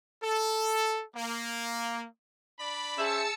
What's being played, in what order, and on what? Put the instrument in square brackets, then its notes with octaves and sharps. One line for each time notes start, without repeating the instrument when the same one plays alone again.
[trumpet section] A4
A#3
D4 D5 B5
[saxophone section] C#4 C5 E5 [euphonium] G#4 [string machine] A5 E6 C#7